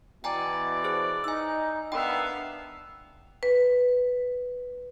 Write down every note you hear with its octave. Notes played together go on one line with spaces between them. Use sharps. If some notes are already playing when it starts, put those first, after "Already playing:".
B2 E3 D5 G5 G#5 A#5
G#4 C5 F#6
D#4 G#5 E6
D#3 B3 D4 E5 F5 G5
B4